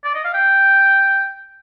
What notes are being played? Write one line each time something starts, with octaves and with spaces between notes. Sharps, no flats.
D5
D#5
F5
G5